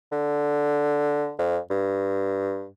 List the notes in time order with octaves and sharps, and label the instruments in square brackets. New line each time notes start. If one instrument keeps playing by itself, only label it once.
[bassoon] D3
F2
G2